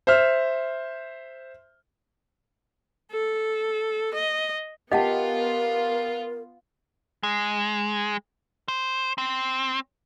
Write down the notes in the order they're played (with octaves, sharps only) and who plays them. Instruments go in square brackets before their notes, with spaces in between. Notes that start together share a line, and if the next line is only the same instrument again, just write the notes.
[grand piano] C5 E5 F6
[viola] A4
D#5
[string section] B3 F4 [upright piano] G4 [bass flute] A#4 [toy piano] D#5 F#5 A5
[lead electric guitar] G#3
C5
C4